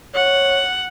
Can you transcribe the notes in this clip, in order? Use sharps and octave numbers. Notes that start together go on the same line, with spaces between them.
C#5 F#5